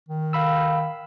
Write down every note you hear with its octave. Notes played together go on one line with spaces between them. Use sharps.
D#3
F5 B5 E6